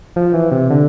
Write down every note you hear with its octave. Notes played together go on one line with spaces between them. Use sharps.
F3
E3
C3
D3